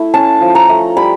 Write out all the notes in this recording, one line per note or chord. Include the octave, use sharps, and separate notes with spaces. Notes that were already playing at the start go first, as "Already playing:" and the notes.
Already playing: A3 E4
C#4 A5
F3
A#5
A3
G3 B5